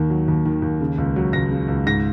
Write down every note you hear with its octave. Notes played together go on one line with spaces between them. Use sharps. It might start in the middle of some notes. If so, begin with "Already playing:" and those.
Already playing: D#2 D#3
F#3
D#2
D#3
D#2
C#3
C#2
F#3
C#2 A#6
C#3
C#2
G#2 A#6